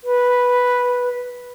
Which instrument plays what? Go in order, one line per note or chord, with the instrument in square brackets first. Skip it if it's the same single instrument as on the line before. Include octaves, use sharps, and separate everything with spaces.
[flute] B4